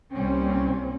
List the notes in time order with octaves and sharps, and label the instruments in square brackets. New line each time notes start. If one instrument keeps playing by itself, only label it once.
[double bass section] C2 G3 A#3 C4 C#4